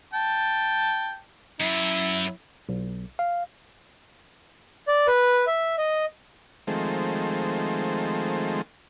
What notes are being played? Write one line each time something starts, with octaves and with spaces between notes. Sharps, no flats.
G5 A5
F#2 E4
B1
F5
D5
B4
E5
D#5
D#3 F3 G#3 A3 C4